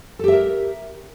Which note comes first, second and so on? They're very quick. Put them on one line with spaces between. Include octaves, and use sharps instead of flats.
A4 G4 E5 A#4